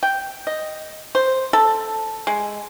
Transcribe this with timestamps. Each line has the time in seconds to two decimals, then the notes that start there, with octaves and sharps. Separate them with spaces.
0.03 G5
0.47 D#5
1.15 C5
1.53 A4
2.27 G#3